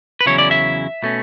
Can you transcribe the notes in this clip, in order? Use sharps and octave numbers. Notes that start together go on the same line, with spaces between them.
B4
E2 C#3 F#3 C#4 E4 C#5
D5
E5
B2 A3 C#4